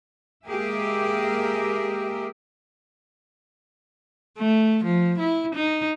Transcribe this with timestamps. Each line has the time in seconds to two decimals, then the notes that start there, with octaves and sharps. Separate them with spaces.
0.46 G#3 A#3 G4 G#4 A#4 E5
4.38 A3
4.84 F3
5.19 E4
5.55 D#4